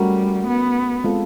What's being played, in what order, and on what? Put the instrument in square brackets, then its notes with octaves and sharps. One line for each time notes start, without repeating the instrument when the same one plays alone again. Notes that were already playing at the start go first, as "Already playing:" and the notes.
Already playing: [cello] G3 [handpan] A3 C#4 F#4 A#4
[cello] B3
[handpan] G#3 C4 F4 A4